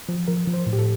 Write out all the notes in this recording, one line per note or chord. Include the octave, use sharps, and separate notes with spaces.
F3
F3 A#4
F3
C5
A2
G4
A4